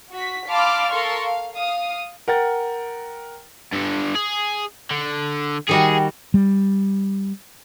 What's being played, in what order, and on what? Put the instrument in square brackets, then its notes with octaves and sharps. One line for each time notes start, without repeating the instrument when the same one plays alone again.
[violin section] F#4 B6
F5 A5 B5 C6 D6 F6
A4 A#4 F5 C6 C#6
F5
F5 D#6
[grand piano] A#4 F#5 G5 A6
[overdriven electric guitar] G2 D3
G#4
D3
[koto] D#3 G3 F#4 [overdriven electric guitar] G#4
[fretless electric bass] G3